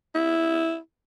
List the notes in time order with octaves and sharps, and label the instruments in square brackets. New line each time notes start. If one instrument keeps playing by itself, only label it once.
[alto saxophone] E4